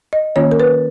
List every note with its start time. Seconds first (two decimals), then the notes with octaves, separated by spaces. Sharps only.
0.13 D#5
0.36 D#3 A#3 C#4 F4 C#5
0.52 A#4
0.60 B4